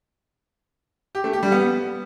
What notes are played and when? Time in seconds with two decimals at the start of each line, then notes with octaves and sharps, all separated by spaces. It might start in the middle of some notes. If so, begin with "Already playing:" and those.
1.15 G4
1.24 A3
1.33 G4
1.43 G3
1.52 B3